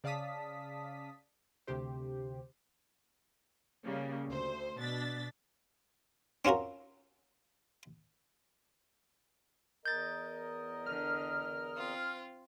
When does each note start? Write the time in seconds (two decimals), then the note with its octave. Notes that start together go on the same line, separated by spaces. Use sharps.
0.04 C#3 D5 F5 A5 D#6 B6
1.67 D2 C3 G4 C5
3.85 C#3 G3 A#3
4.28 D2 C5
4.79 B2 D4 A6 B6
6.45 C4 C#4 F4 F#4 A#4
9.86 E2 A#4 D#5 G6 A6
10.86 D3 F6
11.76 C4 F4